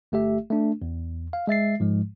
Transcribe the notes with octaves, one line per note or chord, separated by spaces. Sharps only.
G1 A3 G4 E5
A3 D4
E2
F5
G#3 E5 A6 C7
G#2 F3 G#3